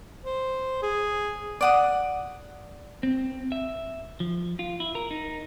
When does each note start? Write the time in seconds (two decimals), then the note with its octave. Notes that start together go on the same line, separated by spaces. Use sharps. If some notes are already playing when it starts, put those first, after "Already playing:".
0.25 C5
0.82 G#4
1.61 D5 F#5 D#6
3.03 C4
3.52 E5
4.20 F3
4.59 F4
4.80 E4
4.95 A#4
5.11 D#4